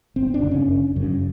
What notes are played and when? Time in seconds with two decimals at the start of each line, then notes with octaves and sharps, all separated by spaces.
0.16 F#1 C4
0.34 D4
0.43 F#2 C#3
0.51 C#4
0.69 F#1
0.96 F#2 C#3